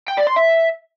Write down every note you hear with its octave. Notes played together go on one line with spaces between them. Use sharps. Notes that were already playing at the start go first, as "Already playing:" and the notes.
G5
D5
C6
E5